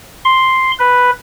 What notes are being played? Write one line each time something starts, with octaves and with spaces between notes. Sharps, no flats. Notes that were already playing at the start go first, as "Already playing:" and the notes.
C6
B4